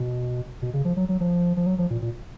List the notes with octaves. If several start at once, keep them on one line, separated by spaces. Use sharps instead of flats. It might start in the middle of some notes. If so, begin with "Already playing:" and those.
Already playing: B2
B2
C#3
F3
F#3
F#3
F3
F3
F#3
F3
A#2
A#2